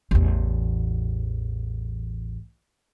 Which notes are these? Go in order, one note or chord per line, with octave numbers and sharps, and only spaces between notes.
A1 E2